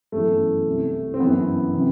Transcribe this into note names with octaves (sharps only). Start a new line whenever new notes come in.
G1 F#2 E3 A3
C2 B2
C4
G1 F#2 E3 B3
C3 E3